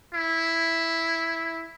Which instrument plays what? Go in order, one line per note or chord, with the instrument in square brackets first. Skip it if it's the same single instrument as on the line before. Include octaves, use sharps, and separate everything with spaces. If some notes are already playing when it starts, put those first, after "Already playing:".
[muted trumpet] E4